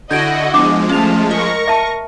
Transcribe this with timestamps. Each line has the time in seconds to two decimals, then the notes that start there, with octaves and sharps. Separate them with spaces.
0.11 D3 E4 F#4 D#5 G6 G#6 D7
0.54 F3 G#3 B3 D4 D6
0.89 A3 C#4 F4 A5 F7
1.31 A#4 D#5 C#6 A#6
1.68 E5 A5